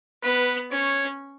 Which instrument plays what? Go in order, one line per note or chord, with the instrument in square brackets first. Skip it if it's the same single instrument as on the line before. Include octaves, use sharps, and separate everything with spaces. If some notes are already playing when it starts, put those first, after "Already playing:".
[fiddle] B3 [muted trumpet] B4
[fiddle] C#4 [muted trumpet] C#5